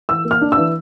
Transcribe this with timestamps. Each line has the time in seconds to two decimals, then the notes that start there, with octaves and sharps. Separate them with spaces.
0.09 E3 E6
0.25 A#3
0.31 F6
0.41 D4
0.52 E3 E6